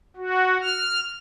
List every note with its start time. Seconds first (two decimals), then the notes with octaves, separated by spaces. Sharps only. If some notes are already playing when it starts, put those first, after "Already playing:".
0.17 F#4
0.61 F6